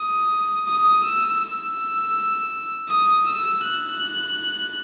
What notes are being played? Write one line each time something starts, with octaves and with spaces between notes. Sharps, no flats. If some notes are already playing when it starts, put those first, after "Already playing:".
Already playing: D#6
D#6
E6
E6
D#6
E6
F#6